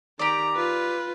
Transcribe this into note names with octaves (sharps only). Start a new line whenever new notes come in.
D#3 G4 D5 A#5
F4 B4